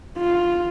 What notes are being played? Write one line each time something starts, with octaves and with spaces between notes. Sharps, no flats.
F4